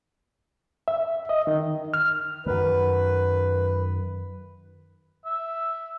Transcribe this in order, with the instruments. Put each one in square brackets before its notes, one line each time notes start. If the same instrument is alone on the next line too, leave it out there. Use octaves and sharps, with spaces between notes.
[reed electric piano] E5
D#5
D#3
F6
[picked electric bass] F#2 D#3 [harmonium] B4
[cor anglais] E5